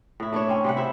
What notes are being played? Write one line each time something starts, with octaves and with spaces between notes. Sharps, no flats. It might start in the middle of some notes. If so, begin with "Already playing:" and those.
A2 E4
A3 D4 E4 C#5
C4 C#4
C3 G3 F#5
E4 C5 E5